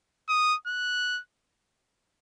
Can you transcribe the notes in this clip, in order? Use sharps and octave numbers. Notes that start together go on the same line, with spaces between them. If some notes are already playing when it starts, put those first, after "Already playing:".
D#6
F#6